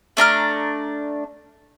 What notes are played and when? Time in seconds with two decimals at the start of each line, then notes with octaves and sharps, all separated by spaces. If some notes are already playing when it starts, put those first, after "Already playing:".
0.17 A3 D4 A#5 F6